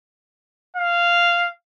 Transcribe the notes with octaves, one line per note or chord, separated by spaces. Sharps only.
F5